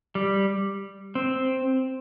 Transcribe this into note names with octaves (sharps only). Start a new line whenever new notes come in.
G3
C4